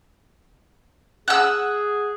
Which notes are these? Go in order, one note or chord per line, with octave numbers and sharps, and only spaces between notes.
G#4 F#5 E6